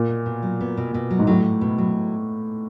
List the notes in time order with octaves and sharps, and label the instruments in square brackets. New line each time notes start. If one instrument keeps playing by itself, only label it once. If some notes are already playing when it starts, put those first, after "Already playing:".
Already playing: [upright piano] A#2
[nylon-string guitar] B2
B2
F#3
B3
B2
B2
F#3
[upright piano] G#2
[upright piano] A2 [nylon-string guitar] F#3
[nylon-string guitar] F#3
B2
F#3